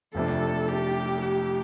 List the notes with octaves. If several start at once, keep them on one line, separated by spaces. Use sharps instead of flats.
F1 F2 C3 A3 D4 A4
G4
G4